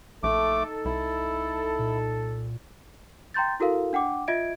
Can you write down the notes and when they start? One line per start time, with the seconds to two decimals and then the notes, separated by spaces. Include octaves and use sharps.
0.23 A#1 A3 D#4 A4 D6
0.85 C2 E4
1.79 A#2
3.34 G5 A#5 C6 G6 A6
3.60 E4 F#4 A4 A#4 F5
3.93 D4 F#5 G5 D6
4.28 F4 D#5 E5 G#6 D7